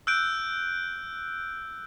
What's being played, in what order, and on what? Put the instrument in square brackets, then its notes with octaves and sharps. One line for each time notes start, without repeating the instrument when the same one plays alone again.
[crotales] E6 F#6 G6 D7